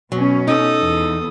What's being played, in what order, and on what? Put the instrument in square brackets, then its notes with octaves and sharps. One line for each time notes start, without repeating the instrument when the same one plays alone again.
[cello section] B2 C#4 [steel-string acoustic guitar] F#3
[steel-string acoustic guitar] D#4 [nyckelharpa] A4 D#6
[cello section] E2